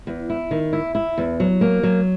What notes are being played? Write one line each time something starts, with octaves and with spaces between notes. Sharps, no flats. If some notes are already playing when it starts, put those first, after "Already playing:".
E2
E4
D#3
E4
E4
E2
F#3
A#3
F#3